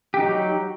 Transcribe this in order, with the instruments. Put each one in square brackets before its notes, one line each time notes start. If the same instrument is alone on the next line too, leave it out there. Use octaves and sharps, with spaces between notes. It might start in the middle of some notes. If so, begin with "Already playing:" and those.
[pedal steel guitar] G4
D#4
F#3